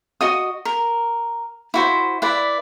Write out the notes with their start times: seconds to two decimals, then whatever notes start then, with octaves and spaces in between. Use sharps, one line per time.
0.21 F#4 D#5 D#6
0.65 A#4
1.74 E4 F#4 C5
2.22 E4 B4 D5